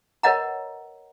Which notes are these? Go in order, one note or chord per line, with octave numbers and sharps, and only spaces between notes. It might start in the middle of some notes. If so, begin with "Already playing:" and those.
A#4 B4 C#5 D#5 F#5 A#5